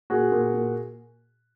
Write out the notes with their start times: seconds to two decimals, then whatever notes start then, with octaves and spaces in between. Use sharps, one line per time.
0.10 A#2 F#4 G#4
0.32 A#2
0.54 A#2